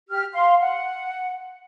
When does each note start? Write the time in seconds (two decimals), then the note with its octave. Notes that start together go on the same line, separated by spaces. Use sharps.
0.10 G4 F6
0.33 F5 C6
0.61 F#5